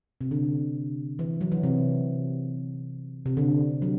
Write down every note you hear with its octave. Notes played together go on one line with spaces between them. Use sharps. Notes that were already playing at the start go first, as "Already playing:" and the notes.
C3
D3
E3
F#3
E3
C3
C3
D3
F#3